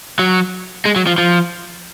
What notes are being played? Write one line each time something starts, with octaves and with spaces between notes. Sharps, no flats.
F#3
G#3
F#3
F3
F3